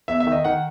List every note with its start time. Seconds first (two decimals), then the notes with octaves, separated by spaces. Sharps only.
0.08 E2 E5
0.20 E5
0.27 D#3
0.32 D#5
0.44 D#3 F#5